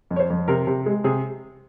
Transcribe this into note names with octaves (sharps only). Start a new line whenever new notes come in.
F2
C#5
C5
F2
C3 A#4
C3
G#3
C3 G#4